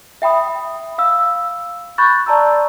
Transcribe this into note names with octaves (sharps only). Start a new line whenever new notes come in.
E5 G5 B5 D#6
F5 E6
B5 C#6 F#6 G6 A6
D5 A5 A#5 C6 E6